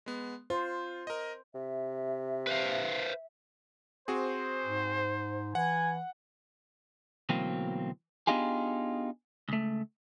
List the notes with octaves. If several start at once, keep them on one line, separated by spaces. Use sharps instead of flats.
G#3 B3
F4 C5
A#4 D#5
C3 E5
B4 C5 F5
C4 F#4 G#4 C5
G#2
E3 F#5 G#5
D2 B2 E3 F#3 A#3 C4
B3 D4 D#4 F4 G4 G#4
C#2 A3